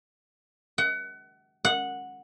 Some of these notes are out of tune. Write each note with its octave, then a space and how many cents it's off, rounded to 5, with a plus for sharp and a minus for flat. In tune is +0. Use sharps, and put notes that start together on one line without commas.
F#5 +30
F#5 -10